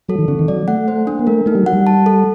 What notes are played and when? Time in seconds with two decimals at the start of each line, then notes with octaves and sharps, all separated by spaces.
0.08 F#3 A4
0.19 D#3
0.28 D3 C4
0.39 D#3
0.48 F#3 D5
0.68 A3 F#5
0.88 C5
1.07 D4
1.19 A#3
1.27 A3 A#4
1.46 A3 D#4
1.55 G3
1.63 F#3 F#5
1.73 G3
1.87 A5
2.06 A4